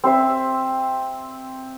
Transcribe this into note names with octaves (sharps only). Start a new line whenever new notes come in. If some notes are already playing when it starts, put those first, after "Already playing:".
C4 C5 E5